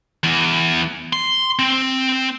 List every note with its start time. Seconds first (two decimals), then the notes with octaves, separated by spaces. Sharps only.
0.24 E2
1.13 C6
1.59 C4